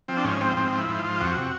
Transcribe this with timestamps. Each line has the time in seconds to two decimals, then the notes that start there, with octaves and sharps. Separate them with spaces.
0.08 F3 C4
0.17 D4
0.25 G#2 C#4
0.41 F3 C4
0.57 G#2 C4
0.72 F3
0.78 E4
0.89 G#2
0.99 F4
1.05 F3
1.21 F2 F#4
1.37 C3